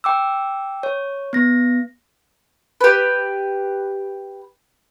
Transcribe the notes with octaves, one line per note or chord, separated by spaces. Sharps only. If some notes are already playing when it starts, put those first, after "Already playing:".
G5 D6 E6
C#5
B3 A#6
G4 B4